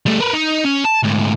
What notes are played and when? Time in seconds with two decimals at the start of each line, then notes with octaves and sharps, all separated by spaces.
0.06 G3 A3
0.20 A#4 B4
0.34 D#4
0.65 C#4
0.85 A5
1.04 D2 G#2